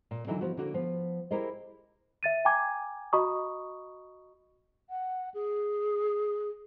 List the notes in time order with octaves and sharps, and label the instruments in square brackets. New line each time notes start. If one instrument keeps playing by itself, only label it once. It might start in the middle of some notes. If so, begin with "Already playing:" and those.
[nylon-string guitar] A#2
D3 E3 F#3 D#4 E4 A#4
F3 B3 F#4
D3 A#3 F#4
F3 B3
E4 G4 G#4 A#4 C5 D#5
[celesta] E5 A6 D#7
G5 G#5 A#5 D6 G#6
F#4 D#5 A#5 B5 C#6 D#6
[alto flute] F#5
G#4